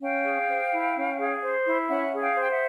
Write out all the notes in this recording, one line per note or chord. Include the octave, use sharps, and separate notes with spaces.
C#4 F5 G5
G#4
C5
E4
C#4
G#4
C5
E4
C#4 E5 F#5
G#4
F5 G5
C5 G5
E5 F#5